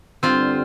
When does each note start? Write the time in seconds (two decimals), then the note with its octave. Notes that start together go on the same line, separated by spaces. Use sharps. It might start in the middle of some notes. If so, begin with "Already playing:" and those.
0.23 G2 D3 G3 C4 D4 F4